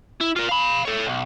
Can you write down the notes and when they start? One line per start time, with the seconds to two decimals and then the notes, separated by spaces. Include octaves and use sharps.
0.21 E4
0.36 F4 A#4
0.49 F5 B5
0.85 A4 C#5
1.07 B1